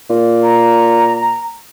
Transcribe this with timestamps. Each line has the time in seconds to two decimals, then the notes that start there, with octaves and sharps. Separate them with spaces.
0.10 A#2
0.44 A#5